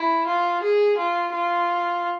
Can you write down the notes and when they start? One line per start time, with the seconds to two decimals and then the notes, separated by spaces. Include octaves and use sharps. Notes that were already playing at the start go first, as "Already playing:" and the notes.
Already playing: E4
0.26 F4
0.62 G#4
0.97 F4
1.33 F4